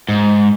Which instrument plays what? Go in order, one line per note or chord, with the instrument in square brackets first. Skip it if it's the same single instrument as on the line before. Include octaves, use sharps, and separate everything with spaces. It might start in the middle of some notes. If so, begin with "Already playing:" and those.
[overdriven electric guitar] G#2